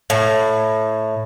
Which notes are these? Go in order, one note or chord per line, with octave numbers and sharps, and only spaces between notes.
A2